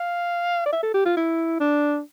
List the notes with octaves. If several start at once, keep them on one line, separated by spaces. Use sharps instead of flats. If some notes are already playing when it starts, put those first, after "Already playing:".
Already playing: F5
D5
E5
A4
G4
F4
E4
D4